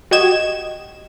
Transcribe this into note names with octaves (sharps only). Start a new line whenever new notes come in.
F#4 G4 D#5 G#6 E7